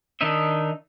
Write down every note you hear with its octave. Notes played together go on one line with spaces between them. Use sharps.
D#3 D4 D#4 D#5 E5